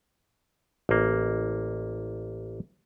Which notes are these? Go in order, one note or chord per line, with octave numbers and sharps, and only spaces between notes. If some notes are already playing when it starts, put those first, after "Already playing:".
A1 A#3